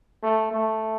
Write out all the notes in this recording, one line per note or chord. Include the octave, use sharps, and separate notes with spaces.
A3
A3